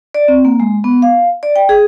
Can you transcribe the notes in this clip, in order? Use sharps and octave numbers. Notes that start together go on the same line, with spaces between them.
D5
C4
A#3
G#3
B3
F5
D5
G5
G#4